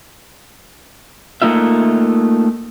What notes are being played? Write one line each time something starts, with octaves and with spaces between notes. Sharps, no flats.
A3 A#3 D#4 F4 E5